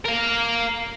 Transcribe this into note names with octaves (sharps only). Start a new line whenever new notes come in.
A#4 F5